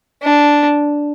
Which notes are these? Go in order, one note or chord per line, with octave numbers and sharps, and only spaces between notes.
D4